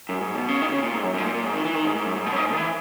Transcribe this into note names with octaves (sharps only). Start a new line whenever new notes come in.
F#2
G#2
B2
C#3
D#3
B2
C#3
A#2
G#2
F#2
F#2
G#2
A#2
A#2
G#2
D#3
E3
D#3
G#2
G#2
F#2
G#2
B2
F#2
G#2
G#2
D#3
E3